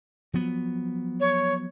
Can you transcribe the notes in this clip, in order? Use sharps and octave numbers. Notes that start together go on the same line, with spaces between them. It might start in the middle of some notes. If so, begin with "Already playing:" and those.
F3 F#3 B3
C#5